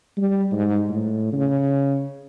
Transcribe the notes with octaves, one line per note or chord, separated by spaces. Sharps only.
G3
G#2
A2
C#3